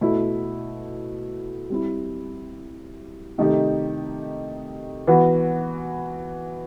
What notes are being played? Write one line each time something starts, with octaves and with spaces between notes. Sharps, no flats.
B2 A3 E4
G3 C4 E4
C3 D#3 A3 D#4 G4
E3 B3 F#4